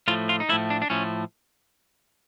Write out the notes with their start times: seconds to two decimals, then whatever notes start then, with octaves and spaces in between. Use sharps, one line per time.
0.08 A2 F3 A3 F4
0.29 F4
0.40 D#4
0.49 A2 F3 A3 E4
0.70 D4
0.82 D4
0.90 A2 F3 A3 C#4